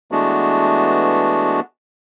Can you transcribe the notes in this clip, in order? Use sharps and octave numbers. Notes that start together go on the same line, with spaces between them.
E3 G#3 A3 B3 D4 F#4